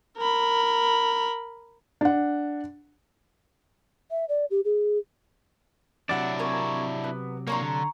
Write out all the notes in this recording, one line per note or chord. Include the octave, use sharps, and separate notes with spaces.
A#4 B5
D4 F#5
E5
D5
G4
G#4
C3 F#3 D4 E4 D5 E5 F#5
A#4 C#5 G#5
B3
A#3 D4 C#5 A#5 C6
D3